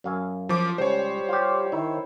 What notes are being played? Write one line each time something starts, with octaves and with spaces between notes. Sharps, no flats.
F#2 F5 G#5
F3 D6
C#2 G3 C5 C#5
F4 G4
D#3 E4